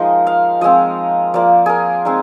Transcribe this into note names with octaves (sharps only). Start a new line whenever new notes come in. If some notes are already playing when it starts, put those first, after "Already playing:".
Already playing: F3 G#3 A#3 D#4 A#4 D#5
F5
F3 G#3 C4 D#5
F3 A#3 F4 D5
G#4 A#4
G#3 C4 D#4